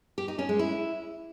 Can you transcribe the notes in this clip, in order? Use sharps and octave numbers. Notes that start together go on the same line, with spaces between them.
G4
D#4
C#4
G#3
E4